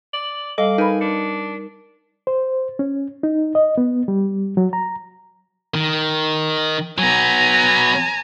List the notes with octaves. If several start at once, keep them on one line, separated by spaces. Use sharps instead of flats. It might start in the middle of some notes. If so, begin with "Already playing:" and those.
D5 F#7
G3 A4 D#5 F5 D6
D#4 A#4 B4 G#5 B5
D4 C#7
C5
C#4
D#4
D#5
B3
G3
F#3
A#5
D#3
F#3 B3 G#5 A#5